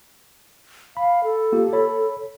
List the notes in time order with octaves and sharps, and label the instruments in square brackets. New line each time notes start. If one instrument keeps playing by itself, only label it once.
[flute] F5 [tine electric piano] B5
[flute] A4
[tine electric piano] A#3 F4 G4
C#5 B5